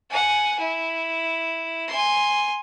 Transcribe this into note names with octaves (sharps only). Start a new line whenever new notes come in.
F#5 G#5
E4
G#5 C6